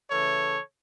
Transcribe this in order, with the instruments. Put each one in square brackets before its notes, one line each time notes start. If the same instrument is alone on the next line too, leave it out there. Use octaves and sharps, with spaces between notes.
[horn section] C#3 E3 A3 A4 C#5